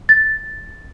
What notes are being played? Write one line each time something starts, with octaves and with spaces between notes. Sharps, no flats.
A6